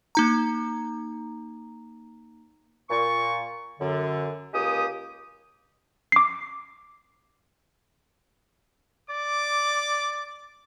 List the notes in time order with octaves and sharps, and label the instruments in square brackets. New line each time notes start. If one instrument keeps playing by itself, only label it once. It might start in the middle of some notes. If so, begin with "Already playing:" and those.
[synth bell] A#3 D#4 A#5
[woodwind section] A#2 C#6
F#2 D3
C#2 G#3 A#3 G4 D#6
[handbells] D6 C7
[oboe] D5 [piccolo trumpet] D6